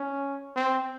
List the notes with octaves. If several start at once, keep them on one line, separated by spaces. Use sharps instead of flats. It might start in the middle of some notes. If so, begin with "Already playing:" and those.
Already playing: C#4
C4